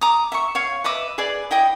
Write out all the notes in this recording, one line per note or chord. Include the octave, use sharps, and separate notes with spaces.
A#5 D6 D#6
E5 C#6
C#5 F5 C#6
B4 D#5 E5 D6
G#4 B4 D5
E4 D#5 G5 D#6